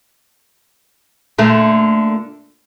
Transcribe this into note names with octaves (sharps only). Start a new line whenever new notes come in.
A#2 D3 A3